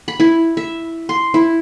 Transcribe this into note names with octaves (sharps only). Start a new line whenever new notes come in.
B5
E4
E5
C6
E4